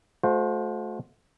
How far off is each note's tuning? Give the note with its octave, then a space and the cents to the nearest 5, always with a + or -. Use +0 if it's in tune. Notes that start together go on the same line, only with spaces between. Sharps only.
A3 -25 F#4 -40 C5 +0